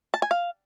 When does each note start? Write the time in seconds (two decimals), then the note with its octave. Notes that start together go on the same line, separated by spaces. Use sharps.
0.14 A5
0.22 G#5
0.31 F5